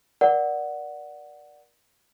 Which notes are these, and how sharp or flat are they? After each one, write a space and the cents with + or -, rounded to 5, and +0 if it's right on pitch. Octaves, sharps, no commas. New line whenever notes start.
A#4 +35 D5 +0 F#5 +0